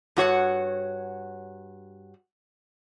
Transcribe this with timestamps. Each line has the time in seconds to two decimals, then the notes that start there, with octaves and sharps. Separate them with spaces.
0.17 G2 F#4 C#5 F#5